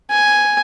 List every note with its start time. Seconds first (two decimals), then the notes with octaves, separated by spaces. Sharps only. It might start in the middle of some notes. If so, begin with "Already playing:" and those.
0.10 G#5